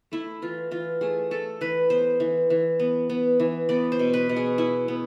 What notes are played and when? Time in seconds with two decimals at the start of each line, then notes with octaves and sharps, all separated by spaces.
0.12 A3 E4
0.42 E3 F4
0.71 E3 F4
1.01 A3 G#4
1.31 A3 A4
1.61 E3 B4
1.90 B3 C5
2.20 E3
2.50 E3
2.79 B3
3.10 B3
3.40 E3
3.69 B3 D5
3.92 C5
3.99 B2
4.14 B4
4.29 B2
4.36 G#4
4.58 B3 E4
4.88 B3